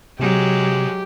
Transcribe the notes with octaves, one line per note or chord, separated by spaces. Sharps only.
C3 F#3 G#3 G4